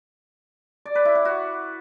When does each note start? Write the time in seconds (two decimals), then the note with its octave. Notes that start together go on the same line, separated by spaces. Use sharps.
0.86 D5
0.95 B4
1.05 E4
1.15 F#5
1.25 F#4